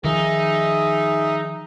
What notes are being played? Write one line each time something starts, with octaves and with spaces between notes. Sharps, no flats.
D#3 F3 D#4 G#4 E5